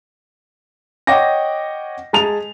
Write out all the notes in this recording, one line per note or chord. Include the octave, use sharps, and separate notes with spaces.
C#5 D#5 F#5 G5 D6 A#6
G#3 A5 F7